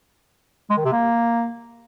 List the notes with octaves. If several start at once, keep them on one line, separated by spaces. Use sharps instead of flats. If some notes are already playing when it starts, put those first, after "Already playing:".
G#3
D#3
C3
A#3